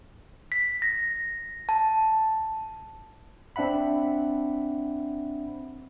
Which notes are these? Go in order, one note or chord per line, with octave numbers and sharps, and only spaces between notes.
B6
A#6
A5
C4 D4 E5 F#5 B5